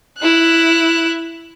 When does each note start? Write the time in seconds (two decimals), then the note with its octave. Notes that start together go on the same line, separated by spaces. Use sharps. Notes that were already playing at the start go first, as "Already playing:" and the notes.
0.19 E4 F#6